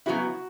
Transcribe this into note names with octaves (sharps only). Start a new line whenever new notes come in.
C#3 F#3 B3 E4 F#4